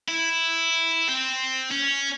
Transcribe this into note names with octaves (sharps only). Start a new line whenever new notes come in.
E4
C4
C#4